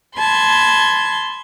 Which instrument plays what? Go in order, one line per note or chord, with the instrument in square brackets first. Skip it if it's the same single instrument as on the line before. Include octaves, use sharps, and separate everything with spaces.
[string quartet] A5 B5 C6 G#6